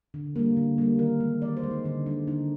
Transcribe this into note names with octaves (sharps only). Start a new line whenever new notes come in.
D3
G3 A#3
D3
G3 A#3
D#3 A#4
G#3
D#3 D5
C5
G#3
D#4
D3 D4
G#3 D4
D3 D#4